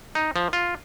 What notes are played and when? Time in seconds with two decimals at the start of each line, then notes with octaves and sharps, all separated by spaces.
0.15 D#4
0.36 F3
0.53 F4